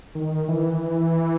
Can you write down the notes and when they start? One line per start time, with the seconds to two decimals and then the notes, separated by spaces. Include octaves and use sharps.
0.15 D#3
0.48 E3